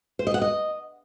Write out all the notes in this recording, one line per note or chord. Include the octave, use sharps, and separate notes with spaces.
C5
D#5
F#5
D#5